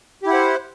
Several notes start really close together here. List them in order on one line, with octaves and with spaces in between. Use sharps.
G4 E4 F#5 C5